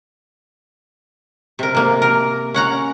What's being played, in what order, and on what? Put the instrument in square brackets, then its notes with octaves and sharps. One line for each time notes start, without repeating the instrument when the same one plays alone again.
[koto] C3 A#4
C3 A#3
A#4
C#4 F#5 A#5